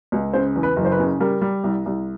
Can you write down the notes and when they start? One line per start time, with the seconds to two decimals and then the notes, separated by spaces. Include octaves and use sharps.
0.12 C#2
0.33 C#3 C5
0.56 E2
0.63 B4
0.76 F#1
0.85 C5
0.92 B4
0.99 C#3
1.20 G3 A#4
1.41 G3
1.64 C2
1.86 C2